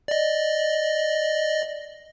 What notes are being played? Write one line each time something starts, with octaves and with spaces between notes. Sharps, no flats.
D5 D#5